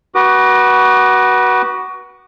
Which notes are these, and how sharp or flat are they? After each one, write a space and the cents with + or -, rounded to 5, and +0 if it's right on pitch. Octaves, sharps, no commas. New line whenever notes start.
F#4 +15 B4 -30 D6 +45